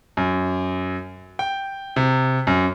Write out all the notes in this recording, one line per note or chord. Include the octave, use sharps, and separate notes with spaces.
F#2
G5
C3
F#2